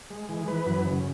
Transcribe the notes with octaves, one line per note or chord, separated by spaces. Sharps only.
G#3
E3
E3 B4
F#2
C#3